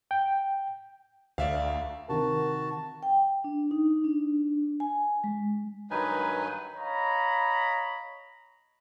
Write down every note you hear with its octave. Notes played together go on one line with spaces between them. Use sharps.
G5
D2 D5 E5 F5
C3 D#3 F#4 A#4 A5
G5
D4
D#4
D4
G#5
G#3
G2 D#3 F#3 D#4 B4 G#5
C#5 D#5 F5 A#5 B5